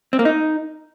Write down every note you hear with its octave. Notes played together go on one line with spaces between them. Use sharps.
C4
A#3
D#4